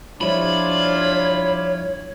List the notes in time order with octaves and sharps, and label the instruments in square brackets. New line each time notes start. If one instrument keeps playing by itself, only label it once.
[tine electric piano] F3 G3 E4 [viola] D4 F4 [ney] C#5 [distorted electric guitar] B5